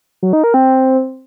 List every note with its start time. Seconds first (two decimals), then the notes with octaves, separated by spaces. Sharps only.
0.23 F#3
0.33 D#4
0.44 A#4
0.54 C4